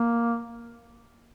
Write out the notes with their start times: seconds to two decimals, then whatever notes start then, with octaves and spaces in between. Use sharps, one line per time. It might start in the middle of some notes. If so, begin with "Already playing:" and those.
Already playing: A#3